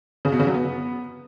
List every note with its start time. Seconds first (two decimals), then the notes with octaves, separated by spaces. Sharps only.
0.25 C#3
0.32 B2
0.40 C#3
0.47 F#3
0.54 B3